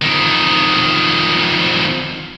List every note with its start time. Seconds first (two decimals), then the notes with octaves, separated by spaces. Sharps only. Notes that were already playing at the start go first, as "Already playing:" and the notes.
0.02 F2 D#3